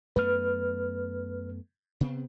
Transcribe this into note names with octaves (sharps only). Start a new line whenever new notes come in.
F#2 A3 B3 B4 F6
C3 B3 C4